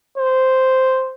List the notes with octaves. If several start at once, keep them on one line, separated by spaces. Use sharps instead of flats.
C5